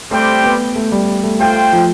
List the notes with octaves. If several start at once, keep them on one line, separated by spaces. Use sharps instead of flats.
G3 A3 C4 G4 C5 G5
B3
A3
G3
A3
A3 F4 C5 G5
F3